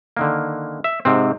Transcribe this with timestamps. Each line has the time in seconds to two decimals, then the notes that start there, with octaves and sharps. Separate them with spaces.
0.17 D3 D#3 A#3
0.84 E5
1.05 G#2 C3 C4